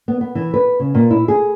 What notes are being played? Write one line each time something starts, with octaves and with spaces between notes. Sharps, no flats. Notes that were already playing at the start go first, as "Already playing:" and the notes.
B3
B3
E3
B4
C#3
A#2
E4
G#4